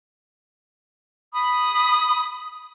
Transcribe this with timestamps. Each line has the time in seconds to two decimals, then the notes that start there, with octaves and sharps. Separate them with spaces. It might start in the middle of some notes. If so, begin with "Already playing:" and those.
1.34 B5 D#6